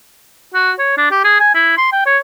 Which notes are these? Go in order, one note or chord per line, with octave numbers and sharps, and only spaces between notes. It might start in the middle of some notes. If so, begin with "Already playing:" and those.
F#4
C#5
D4
G4
G#4
G#5
E4
C6
G5
C#5